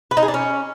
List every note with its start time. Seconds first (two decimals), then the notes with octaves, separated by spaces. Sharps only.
0.11 B4
0.17 D#4
0.23 G#4
0.28 D4
0.34 C#4